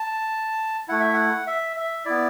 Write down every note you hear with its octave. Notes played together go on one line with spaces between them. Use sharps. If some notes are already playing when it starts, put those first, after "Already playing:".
Already playing: A5
A3 E4 F#5
E5
F#5
E5
E5
B3 E4 D5